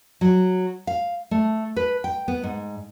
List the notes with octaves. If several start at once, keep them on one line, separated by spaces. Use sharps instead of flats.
F#3
F5
A3
B4
G5
B3
G#2